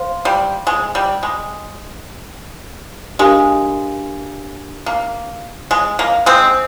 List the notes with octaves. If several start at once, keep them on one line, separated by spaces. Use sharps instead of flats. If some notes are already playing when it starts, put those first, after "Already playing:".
Already playing: C5 F5 C6
G3
G#3
G3
G#3
G#3 D4 G4 A#4 F5 G#5
A#3
G#3
A#3
G#3 C4